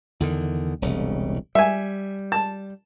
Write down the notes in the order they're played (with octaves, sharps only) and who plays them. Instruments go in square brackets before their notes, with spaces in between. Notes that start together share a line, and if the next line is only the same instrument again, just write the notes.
[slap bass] E2 D3 D#3
E1 C2 C#3
[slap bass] G3 [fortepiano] E5 G#5
[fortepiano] A5